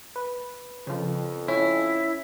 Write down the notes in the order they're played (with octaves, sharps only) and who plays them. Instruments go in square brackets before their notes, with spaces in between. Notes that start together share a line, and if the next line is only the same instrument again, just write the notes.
[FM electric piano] B4
[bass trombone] F2 [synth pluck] C#3 F3
[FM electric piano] C#4 [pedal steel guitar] E4